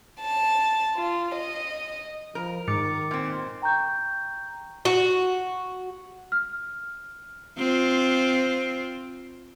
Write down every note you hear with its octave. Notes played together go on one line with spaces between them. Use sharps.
A5
F4
D#5
F3 A#4
G#2 D#3 D6 A6 C#7
A#2 C4
G5 A#5 C#6 G6
F#4
F6
C4 F4